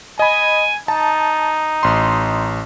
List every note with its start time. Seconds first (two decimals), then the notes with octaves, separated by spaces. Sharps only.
0.19 D#5 G#5 B5
0.88 D#4 A5
1.83 A1 C6